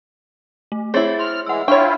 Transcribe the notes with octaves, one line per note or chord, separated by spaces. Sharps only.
A3
C4 E4 G#4 C#5 A6
C6 F6
E3 G#3 F#5 E6
C4 D4 E4 F4 C#5 G5 C#6